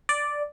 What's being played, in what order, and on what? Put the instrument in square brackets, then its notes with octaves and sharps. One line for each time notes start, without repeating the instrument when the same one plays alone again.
[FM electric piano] D5